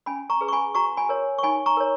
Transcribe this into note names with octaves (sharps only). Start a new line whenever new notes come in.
C#4 G#5 B5
A#5 C#6
G#4 B4
C#6
G#5 B5
F#4 A#5 C#6
G#5 B5
A#4 C#5
C#6
D#4 G#5 B5
A#5 C#6
A#4 C#5